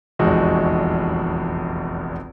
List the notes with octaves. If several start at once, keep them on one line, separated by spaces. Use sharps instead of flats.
F1 A#1 E2 G#3 D#4 F#4